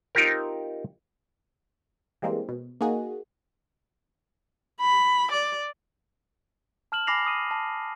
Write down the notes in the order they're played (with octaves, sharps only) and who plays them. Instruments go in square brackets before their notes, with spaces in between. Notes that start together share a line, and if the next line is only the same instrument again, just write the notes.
[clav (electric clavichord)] C4 D#4 F4 G4 A#4
[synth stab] E3 G3 G#3 A#3 C4
B2
A#3 D#4 F#4 G#4
[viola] B5
D5
[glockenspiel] A5 F6 E7 F#7
G#5 B5 D6 A#6 C7 F7
D#6 D#7
A5